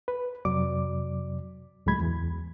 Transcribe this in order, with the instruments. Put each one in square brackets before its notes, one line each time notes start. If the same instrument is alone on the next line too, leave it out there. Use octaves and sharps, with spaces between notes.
[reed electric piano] B4
F2 C3 F#3 D5 D6
C#2 A2 F#3 G#3 B5 G#6
E2 E3